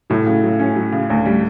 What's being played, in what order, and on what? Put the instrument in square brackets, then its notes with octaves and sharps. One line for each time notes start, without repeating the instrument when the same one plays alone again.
[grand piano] A2 [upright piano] F#3
[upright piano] C#3
F#3
C#4
F#3
C#3
D2
G3